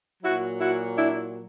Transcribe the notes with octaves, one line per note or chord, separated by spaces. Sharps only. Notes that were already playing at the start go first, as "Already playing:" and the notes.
A#2 F#3 E4 F#4
E4 F#4
D4 E4